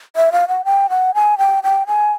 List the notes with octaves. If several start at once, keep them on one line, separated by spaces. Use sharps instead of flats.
E5
F5
F#5
G5
F#5
G#5
G5
G5
G#5